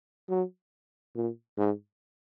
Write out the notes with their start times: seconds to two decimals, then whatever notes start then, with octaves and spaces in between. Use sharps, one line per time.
0.30 F#3
1.15 A#2
1.58 G#2